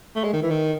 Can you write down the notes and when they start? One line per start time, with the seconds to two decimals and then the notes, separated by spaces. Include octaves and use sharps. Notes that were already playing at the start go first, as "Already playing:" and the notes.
0.15 A3
0.24 G#3
0.33 D#3
0.42 E3
0.50 D#3